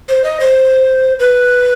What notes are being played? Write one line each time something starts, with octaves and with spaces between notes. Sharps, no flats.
C5
D#5
C5
B4